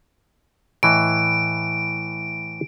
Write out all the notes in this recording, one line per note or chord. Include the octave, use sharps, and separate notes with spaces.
A2 E3 D#5 D7